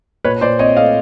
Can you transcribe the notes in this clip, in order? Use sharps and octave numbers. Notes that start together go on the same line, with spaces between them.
A#2 B4 C#5
A#2 C5 D5
C4 C#5 D#5
A3 D#5 F5